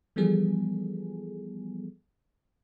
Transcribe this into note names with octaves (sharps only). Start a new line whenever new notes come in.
E3 F3 G3 B3 G#4 A4